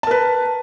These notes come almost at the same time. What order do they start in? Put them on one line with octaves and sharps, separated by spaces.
A5 A#4 B4